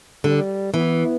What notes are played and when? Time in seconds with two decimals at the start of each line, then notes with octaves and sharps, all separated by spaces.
0.24 D3 G3
0.73 E3 B3